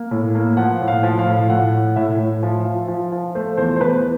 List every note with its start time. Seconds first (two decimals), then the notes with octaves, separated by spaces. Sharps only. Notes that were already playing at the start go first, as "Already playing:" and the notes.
Already playing: A#3
0.11 A2
0.35 A#3
0.57 F3 F#5
0.81 A2
0.88 F5
1.03 F3
1.19 F5
1.26 A2
1.49 A2 F#5
1.73 A2
1.96 A2 E5
2.18 A2
2.43 F3
2.65 F3
2.88 F3
3.12 F3
3.35 A3 C5
3.57 E2 C5
3.76 C5
3.81 E2 B4